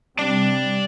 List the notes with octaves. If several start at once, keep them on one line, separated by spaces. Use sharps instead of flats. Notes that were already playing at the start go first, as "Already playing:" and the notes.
C3 G3 D5 A5